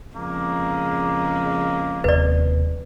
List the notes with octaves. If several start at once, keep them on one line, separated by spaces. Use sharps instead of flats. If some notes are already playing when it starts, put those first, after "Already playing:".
F2 C#3 G#3 A#3
E1 D#2 C3 B4 D5